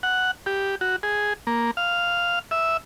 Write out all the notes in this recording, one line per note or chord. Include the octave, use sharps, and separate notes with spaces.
F#5
G4
F#4
G#4
A#3
F5
E5